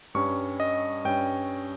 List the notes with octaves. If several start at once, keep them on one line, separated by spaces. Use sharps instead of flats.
G2 G3 C#4 C#6
D#5
G2 G3 C#4 G5